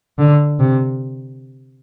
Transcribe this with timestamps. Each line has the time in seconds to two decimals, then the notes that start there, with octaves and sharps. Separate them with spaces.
0.18 D3
0.59 C3